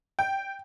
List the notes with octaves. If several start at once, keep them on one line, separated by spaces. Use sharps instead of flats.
G5